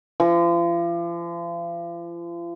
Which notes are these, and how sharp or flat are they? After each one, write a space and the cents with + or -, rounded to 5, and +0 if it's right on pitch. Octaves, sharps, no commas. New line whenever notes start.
F3 -40